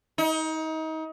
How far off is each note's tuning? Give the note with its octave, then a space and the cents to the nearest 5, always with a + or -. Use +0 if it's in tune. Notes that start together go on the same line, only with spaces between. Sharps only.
D#4 +30